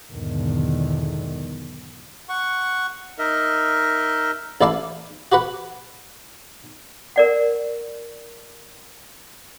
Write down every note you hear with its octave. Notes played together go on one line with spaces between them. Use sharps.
B1 E2 G#2 D3 D#3
F#5 C#6
D#4 A#4 D#5 E5
A1 E4 D5 F5 A5
F#4 G4 B4 F#5
A#4 D5 F#5